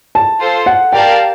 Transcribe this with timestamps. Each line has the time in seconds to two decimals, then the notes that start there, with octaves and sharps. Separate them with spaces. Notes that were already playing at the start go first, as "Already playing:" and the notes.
0.15 A5
0.40 F4 A4 C5
0.66 F#5
0.92 G4 A#4 D5 F5 G5 A5